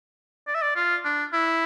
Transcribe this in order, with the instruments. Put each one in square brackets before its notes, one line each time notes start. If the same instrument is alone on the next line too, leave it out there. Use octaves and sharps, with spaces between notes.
[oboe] D5
E5
D5
F4
D4
E4